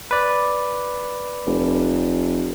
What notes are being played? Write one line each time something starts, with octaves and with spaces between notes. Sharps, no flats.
B4 D5
F1